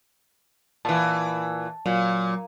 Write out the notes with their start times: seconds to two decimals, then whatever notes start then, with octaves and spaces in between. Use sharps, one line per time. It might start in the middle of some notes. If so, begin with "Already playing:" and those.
0.85 A#2 E3 A5
1.86 A#2 F#3